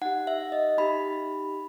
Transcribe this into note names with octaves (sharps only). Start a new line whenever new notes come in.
D#4 G4 F#5
E5
D#5
D#4 G4 B5